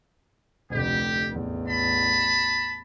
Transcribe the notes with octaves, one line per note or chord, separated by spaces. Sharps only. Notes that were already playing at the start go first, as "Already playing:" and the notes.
F1 D2 G4
A1 E2
A5 B5